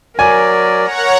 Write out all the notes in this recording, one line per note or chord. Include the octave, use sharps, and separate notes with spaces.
F#3 A#4 D5 G#5
C#5 F#5 A#5